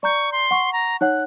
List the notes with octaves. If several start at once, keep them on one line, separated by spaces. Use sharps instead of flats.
D5 A#5 C#6 G6
C6
F#5 C#6
A#5
D#4 C#5 F#5 F#6